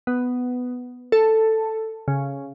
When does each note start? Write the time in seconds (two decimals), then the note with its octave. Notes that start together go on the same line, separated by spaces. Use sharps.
0.07 B3
1.12 A4
2.08 C#3